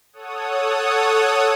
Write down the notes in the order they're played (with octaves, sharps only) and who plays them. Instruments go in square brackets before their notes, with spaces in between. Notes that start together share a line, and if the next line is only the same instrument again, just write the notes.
[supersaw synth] A4 C#5 F#5 D#6